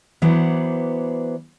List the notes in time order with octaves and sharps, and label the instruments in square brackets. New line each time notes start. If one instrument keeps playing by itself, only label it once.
[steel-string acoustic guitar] E3 F#3 B3 B4 C5 D5